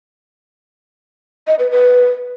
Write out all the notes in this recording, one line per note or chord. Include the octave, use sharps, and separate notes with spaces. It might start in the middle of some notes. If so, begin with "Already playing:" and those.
D#5
B4
B4